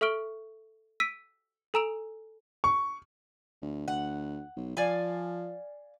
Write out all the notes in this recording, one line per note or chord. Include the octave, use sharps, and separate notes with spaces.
A4 E5 C#6 F6 D7 G7
E6 B6 D7 D#7
A4 G#5 A#5 E6 D7 F7
C#6
D2
D2 F#5
B1
F3 D5 F5 G#5